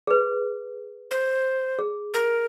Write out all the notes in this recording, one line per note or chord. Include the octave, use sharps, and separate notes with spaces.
G#4 B4
C5
G#4
A#4